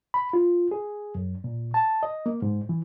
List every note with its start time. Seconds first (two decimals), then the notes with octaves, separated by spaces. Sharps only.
0.14 B5
0.33 F4
0.71 G#4
1.15 F#2
1.44 A#2
1.74 A5
2.03 D#5
2.26 A#3
2.42 G#2
2.69 E3